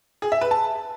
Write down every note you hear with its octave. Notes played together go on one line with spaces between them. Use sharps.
G#4
E5
B4
A5